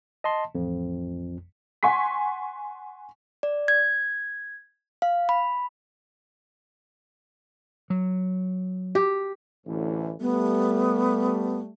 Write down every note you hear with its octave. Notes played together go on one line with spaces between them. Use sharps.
D#5 A5 C6
A1 F2
F#5 G#5 C6 C#6 B6
D5
G#6
F5
B5
F#3
G4
A1 D2 E3
G3 A3 B3